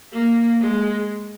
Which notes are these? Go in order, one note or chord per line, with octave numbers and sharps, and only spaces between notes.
A#3
G#3